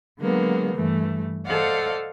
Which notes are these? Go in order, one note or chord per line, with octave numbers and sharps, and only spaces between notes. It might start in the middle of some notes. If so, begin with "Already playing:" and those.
D3 F#3 G#3 A#3 B3
G2 E3 A3
A4 C5 D5 D#5 F5 F#5